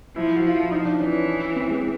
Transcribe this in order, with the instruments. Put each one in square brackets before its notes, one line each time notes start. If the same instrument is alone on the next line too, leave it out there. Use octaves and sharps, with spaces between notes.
[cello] F3 [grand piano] E4
[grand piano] F#4
[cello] F3 [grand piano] F4
[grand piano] E4
D#4
D4
[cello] E3 [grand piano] C#4
[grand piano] C4
G#3